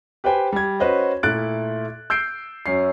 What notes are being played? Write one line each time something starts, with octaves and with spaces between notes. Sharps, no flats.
G4 B4 C5 G5 G#5
G3 G#6
C#4 F#4 B4 C5 D#5
A#2 A3 E4 F#6 A6 D7
E6 G6 C7 D7
F#2 C#4 C7